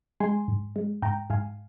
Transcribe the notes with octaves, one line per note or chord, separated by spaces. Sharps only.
G#3 G#5 C6
G#2
G#3
G#2 G5 A#5
G#2 F5 G#5